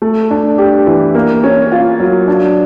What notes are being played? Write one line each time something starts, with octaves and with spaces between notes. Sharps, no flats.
A3
D4
G4
E3
A#3
C#4
F4
F#3
D4